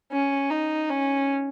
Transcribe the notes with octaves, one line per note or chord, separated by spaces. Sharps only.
C#4
D#4
C#4